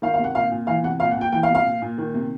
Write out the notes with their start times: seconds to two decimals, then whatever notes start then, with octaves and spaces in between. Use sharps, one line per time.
0.02 D#3 F5
0.14 F5
0.19 C3 F#5
0.34 A#2 F5
0.51 A#2
0.67 E3 F5
0.84 C3 F#5
1.00 A#2 F5
1.11 F#5
1.16 A#2
1.21 G5
1.32 E3 G5
1.43 F5
1.49 C3
1.55 F5
1.65 A#2
1.82 A#2
1.98 D#3
2.14 C3